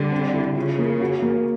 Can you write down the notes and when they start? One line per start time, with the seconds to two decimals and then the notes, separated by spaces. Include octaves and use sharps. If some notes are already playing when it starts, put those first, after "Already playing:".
Already playing: D3 G3
0.11 C4
0.34 E4
0.56 C#3 F4
0.79 A#3
1.01 F#4
1.22 A#3